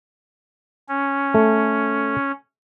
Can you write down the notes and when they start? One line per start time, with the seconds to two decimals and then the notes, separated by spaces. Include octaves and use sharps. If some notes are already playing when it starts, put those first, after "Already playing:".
0.89 C#4
1.34 A3